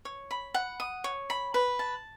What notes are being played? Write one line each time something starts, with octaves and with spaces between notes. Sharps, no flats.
C#5
B5
F#5
D#6
C#5
B5
B4
A5